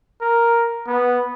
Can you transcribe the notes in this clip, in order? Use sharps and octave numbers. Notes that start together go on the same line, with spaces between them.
A#4
B3